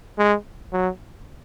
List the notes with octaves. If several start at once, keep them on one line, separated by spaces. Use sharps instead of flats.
G#3
F#3